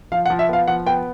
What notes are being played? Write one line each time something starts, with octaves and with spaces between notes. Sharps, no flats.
F3 F5
F#5
F3
E5
B3 F5
F3 F#5
B3 G5